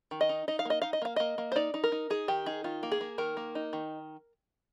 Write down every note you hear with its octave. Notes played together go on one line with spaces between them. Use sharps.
D#3
D#5
D#4
D#4 D#5
F5
A#3 D#5
D#4 F5
D#5
A#3 F5
A#3 D#5
A#3
C5
D#4 D5
D#4
A#4
D#4
D#4 G#4
D#3 G4
D#4 G#4
D#3 F4
A#3
G#4
A#3
D#3 A#4
A#3
D#4
D#3